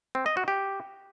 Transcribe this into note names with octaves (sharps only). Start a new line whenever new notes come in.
C4
D#5
F#4
G4